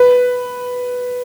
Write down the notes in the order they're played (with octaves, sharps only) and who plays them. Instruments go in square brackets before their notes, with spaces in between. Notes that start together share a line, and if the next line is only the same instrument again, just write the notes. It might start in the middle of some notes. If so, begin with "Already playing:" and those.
Already playing: [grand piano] B4